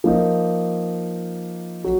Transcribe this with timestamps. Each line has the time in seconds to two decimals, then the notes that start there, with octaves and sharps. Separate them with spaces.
0.04 F3 A#3 D#4
1.84 F#3